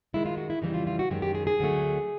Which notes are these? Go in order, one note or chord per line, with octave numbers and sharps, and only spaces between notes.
F#2 D#3 G#3 E4
F4
F#4
E4
F2 C#3 E3 G3 D#4
F4
F4
F#4
F#2 D#3 G#3 G4
G4
G#4
G#4
D2 D3 F#3 A3